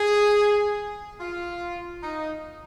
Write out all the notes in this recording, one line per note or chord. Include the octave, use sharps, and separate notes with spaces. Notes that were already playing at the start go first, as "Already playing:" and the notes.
Already playing: G#4
F4
D#4